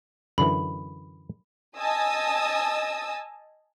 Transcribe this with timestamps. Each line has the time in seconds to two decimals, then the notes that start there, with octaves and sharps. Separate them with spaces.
0.38 F#2 D3 E3 B5
1.78 D#5 G#5 A5 D#6 E6